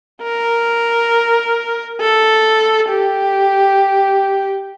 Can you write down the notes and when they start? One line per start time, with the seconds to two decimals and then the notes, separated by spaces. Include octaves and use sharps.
0.23 A#4
2.00 A4
2.89 G4